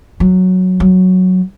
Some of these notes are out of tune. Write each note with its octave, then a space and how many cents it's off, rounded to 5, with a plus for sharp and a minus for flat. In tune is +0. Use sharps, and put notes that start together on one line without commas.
F#3 -5
F#3 +0